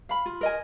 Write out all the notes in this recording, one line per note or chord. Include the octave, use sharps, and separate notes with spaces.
F5 B5
F4
A#4 D#5 G#5